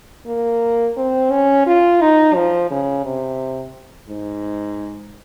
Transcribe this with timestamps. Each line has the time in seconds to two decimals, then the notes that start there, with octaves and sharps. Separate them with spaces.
0.27 A#3
0.97 C4
1.31 C#4
1.67 F4
2.01 D#4
2.35 F3
2.71 C#3
3.05 C3
4.09 G#2